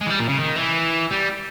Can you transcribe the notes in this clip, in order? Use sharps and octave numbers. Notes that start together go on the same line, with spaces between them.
G#3
E3
G3
A#2
C#3
D#3
E3
G3